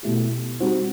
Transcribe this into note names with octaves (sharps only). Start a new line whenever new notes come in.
B2 A3 E4 G4
G3 C4 D#4 F#4